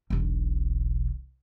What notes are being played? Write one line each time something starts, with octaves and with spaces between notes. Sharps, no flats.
E1 B1